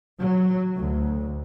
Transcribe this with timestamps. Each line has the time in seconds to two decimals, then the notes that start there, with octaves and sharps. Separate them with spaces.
0.20 F#3
0.78 D2